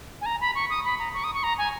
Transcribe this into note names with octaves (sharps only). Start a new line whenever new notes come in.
G#5
A#5
B5
C#6
D#6
B5
A#5
C#6
D#6
C#6
A#5
G#5